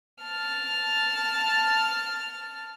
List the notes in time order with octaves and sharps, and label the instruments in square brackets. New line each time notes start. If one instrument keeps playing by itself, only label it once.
[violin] A5 F6